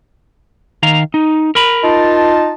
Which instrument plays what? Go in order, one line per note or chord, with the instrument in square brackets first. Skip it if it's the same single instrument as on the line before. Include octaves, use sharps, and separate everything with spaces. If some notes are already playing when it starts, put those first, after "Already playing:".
[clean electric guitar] D#3 F5 A#5
D#4
A#4 A#5 B5
[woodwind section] D#4 F4 A5